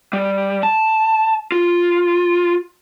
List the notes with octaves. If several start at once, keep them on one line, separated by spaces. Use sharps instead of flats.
G3
A5
F4